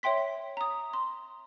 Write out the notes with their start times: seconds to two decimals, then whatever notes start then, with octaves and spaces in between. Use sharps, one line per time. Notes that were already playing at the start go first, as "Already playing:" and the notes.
0.03 C#5 E5 G5 C6 B6
0.57 A#5 D#6
0.94 C6